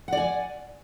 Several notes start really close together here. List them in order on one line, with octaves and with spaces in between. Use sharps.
F#5 D5 G#5